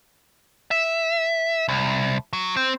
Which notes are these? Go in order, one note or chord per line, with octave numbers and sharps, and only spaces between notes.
E5
C2
F#3
C4